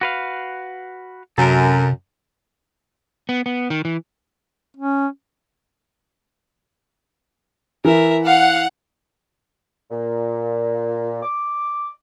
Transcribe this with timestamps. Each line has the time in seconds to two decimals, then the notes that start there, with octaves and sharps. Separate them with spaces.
0.01 F#4 B4 F5
1.38 F#2 C3 A4 A#4
3.29 B3
3.46 B3
3.70 D#3
3.85 E3
4.77 C#4
7.85 E3 A#4 E5
8.26 F5 F#5
9.91 A#2
11.23 D6